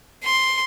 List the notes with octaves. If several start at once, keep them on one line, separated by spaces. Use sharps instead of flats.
C6